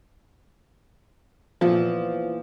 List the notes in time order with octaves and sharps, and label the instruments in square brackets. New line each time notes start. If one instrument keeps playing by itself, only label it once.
[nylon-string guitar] A#2 E3 B3 [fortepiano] F3